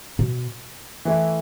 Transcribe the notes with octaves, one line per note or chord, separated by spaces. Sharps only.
B2
E3 A3 E4